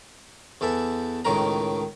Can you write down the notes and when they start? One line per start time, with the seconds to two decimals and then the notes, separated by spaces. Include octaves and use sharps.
0.61 E2 E3 A4 E5
1.25 C#2 A2 D#3 A#4 A#5